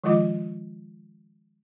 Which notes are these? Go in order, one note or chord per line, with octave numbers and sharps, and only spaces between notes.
D#3 F3 G#3 F4 D#5 D6